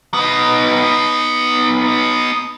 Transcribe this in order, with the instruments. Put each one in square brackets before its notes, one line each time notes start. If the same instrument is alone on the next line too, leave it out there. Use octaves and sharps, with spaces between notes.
[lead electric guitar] B3 D#4